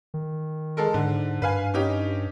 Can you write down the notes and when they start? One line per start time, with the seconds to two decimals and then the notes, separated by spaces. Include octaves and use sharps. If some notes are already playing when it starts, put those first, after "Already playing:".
0.14 D#3
0.77 G#3 A4 A#4
0.94 G#2 D3
1.42 G2 B4 F5 G#5
1.74 C#4 D#4 G4